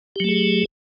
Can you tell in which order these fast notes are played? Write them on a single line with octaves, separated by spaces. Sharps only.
G4 F#3 A3 G#4